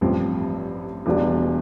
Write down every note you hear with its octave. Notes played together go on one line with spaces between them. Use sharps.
A1 G2 F3 C4 G4
E1 E2 B2 G3 D4